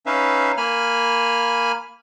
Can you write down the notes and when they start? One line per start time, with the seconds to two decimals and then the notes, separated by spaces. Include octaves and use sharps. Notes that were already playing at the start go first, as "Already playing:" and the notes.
0.06 C#4 D#4 B4 E5 F5
0.57 A#3 G#5 B5 F6